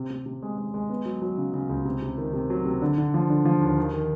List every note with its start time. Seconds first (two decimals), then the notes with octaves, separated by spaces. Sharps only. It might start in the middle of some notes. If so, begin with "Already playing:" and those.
Already playing: C3
0.10 C3
0.26 C3
0.43 G#3
0.58 G#3
0.74 G#3
0.89 B3
1.06 F#3
1.22 F#3
1.38 C#3
1.54 C#3
1.69 C#2
1.85 C3
2.02 C3
2.18 D#3
2.33 C3
2.50 F#3
2.66 C3
2.82 D3
2.98 D3
3.14 F3
3.30 D3
3.45 F3
3.61 D#2
3.78 D#3
3.94 D#3